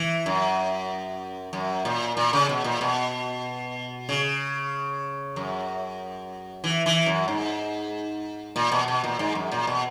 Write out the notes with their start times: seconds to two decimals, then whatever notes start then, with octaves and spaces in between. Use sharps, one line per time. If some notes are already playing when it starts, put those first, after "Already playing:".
Already playing: E3
0.26 F#2
1.53 F#2
1.85 A#2
2.17 A#2
2.33 C#3
2.49 B2
2.64 A#2
2.81 B2
4.09 C#3
5.36 F#2
6.64 E3
6.86 E3
7.06 F#2
7.28 G#2
8.56 A#2
8.72 B2
8.88 B2
9.04 A#2
9.19 G#2
9.35 F#2
9.52 A#2
9.67 B2